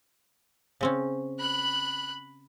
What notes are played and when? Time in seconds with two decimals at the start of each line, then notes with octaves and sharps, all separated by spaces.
0.81 C#3 C4 C#4
1.39 B5 F#6